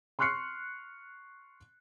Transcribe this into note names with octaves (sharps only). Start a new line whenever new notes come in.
C6 C#6 F6 F#6 C7 C#7